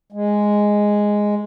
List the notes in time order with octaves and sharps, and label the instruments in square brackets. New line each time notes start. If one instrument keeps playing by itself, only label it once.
[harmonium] G#3